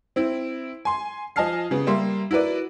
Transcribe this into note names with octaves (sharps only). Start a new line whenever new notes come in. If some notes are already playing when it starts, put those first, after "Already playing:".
C4 E4
G#5 C6
F3 D#5 G#5 A5 F6 C7
C#3 B3 G#4
G3 A#3 E5 C6
E4 F#4 A#4 B4 D5